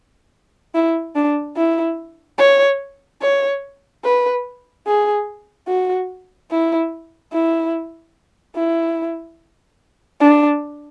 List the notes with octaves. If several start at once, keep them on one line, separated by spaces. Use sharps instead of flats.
E4
D4
E4
C#5
C#5
B4
G#4
F#4
E4
E4
E4
D4